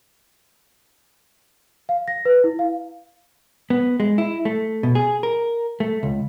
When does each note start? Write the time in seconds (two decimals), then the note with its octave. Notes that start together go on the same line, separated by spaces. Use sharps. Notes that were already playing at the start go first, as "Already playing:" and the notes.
1.89 F5
2.08 A#6
2.25 B4
2.44 E4
2.59 F5
3.70 B3
4.00 G#3
4.18 E4
4.45 A3
4.83 B2
4.95 G#4
5.23 A#4
5.80 A3
6.03 C#2